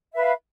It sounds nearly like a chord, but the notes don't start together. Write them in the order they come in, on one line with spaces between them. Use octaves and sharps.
E5 B4 F5